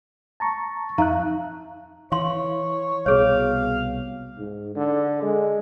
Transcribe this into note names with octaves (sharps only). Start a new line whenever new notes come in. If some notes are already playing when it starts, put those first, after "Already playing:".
A5 A#5 C#6
F2 D#4 E5 F5 A#5 F#6
E3 C#5 F5 C6
C2 B2 G#4 C#5 F5
G#2
D3
G#3